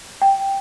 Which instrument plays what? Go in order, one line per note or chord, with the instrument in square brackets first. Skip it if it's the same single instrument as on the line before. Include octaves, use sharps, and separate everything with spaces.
[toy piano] G5